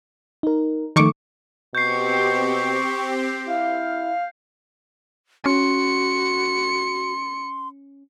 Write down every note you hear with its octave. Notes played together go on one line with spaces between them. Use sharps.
D#4 A#4
D#3 F3 A3 C#6 D6
B2 C4 G4 C#6 G6 C7
E4 F5
C#4 F#4 C6 C#7